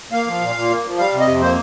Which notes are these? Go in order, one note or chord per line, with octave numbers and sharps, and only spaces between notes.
A#3 F5
F3
A#2
A#2
A#3
F3
G3 F5
C3
D#5
F2
A#3 C5